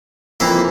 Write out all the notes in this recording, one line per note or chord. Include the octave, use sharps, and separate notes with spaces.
F2 E3 A#3 E4